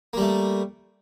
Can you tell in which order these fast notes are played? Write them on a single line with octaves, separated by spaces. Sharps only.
A#3 G3 A3